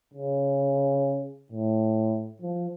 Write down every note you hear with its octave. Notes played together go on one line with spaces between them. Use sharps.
C#3
A2
F3